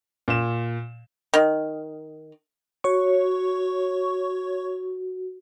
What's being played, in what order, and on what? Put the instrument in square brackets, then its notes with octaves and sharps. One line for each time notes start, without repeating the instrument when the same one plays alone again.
[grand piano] A#2 E7
[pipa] D#3
[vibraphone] F#4 [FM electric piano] C#5 C#6